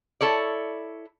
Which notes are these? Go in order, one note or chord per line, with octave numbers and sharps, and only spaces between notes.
E4 A4 C#5 D5